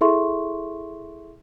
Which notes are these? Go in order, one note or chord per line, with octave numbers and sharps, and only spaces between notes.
E4 G#4 A4 E5 C6 C#6